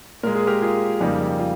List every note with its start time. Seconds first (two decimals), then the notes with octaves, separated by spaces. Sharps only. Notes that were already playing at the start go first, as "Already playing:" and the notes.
0.23 A#2 G#3 A#4
0.35 G#4
0.47 G4 A#4
0.62 F4 G#4
1.01 F2 C#3 G3 A#3 D#4 G4
1.40 F4